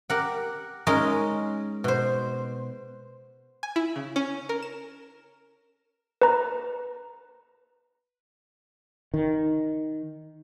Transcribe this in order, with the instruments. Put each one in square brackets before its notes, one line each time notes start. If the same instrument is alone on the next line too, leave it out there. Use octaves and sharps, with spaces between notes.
[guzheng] G4 A#4 F#5
G#3 C#4 D#4 A#4
B2 C5
[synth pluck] G#5
E4
C#3
C#4
A#4
E7
[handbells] B4 A#5
[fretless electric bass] D#3